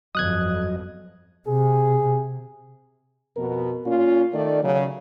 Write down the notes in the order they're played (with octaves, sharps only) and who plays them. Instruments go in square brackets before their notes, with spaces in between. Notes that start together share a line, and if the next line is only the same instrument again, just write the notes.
[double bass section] G1 F2 [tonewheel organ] F#3 D#5 [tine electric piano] D#6 F#6 G#6
[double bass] C3 [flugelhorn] G#4
[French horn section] F2 B2 B3 A#4
A#2 C#4 F4
D#3 A3 D5
C#3 F#3